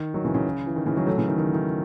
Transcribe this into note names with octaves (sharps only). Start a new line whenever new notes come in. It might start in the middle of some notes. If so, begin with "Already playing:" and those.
Already playing: D#3
D#3 F#3
C#3 E3
C#3
E3
D#3
C#3 E3
D#3 F#3
F#3 A3
C#3 E3
D#3
D#3
D#3